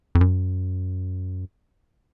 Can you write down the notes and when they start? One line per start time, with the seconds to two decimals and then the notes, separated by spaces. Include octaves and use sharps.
0.15 F2
0.21 F#2